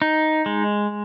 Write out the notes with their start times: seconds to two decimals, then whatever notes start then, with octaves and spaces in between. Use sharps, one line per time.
0.02 D#4
0.46 G#3